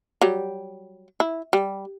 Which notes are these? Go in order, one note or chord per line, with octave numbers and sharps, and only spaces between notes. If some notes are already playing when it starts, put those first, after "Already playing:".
F#3 G3 G4
E4
G3